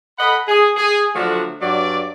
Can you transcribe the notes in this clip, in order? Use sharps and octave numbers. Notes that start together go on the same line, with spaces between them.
A4 D#5 F#5 B5
G#4
G#4
D3 F3 F#3 A3 D4 F#4
G2 F#3 D5